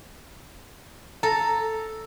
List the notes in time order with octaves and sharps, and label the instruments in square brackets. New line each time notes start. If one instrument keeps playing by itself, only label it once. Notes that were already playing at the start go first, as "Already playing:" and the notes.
[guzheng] A4 [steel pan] A#5